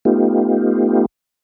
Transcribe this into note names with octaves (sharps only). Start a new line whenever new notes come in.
A3 B3 D#4 F4 G4